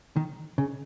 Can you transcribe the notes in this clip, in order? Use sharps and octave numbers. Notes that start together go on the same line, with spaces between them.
D#3
C#3